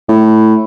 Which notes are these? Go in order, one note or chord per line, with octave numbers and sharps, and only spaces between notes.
A2